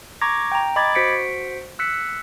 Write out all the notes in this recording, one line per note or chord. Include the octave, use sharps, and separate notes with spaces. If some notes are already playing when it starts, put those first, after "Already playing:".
A#5 C#6 D6 G#6 A#6
G5 A#5
D#5 B5 D6 G#6 A6
F#4 C5 B6 C#7 D7
E6 F#6 B6 C#7